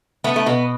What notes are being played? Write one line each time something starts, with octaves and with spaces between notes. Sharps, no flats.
A3 B3
A3
B2 B3